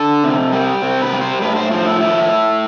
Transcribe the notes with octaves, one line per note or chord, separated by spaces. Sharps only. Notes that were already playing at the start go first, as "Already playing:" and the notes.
Already playing: D3 A4
C3
G3
C3 C4
B4
G3
C5
A2 B4
C5
F3 C5
E4
A3 E4